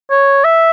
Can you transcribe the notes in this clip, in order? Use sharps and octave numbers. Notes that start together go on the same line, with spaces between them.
C#5
E5